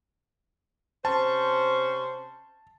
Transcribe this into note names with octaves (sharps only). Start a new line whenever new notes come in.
C3 C#4 C5 A5